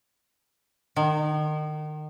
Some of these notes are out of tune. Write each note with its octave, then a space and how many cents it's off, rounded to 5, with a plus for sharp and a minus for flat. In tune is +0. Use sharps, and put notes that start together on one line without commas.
D#3 -30